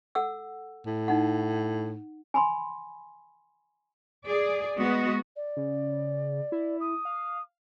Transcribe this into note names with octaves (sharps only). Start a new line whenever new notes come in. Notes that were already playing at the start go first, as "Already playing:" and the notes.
A4 F#5 E6
A2
D#4 F#5
G#5 B5 C6
G#4 D5
G#3 B3 F#4 D#5
D5
C#3
E4
D#6
F5